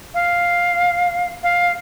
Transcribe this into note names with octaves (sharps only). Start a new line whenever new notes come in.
F5
F5